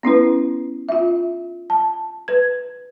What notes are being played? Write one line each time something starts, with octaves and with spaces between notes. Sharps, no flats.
B3 C#4 E4 B4
F4 E5
A5
B4 G#6